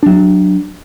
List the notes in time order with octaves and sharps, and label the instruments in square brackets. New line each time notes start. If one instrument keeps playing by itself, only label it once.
[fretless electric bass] F#3 D4